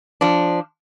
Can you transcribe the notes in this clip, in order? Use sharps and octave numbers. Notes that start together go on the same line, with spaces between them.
F3 D4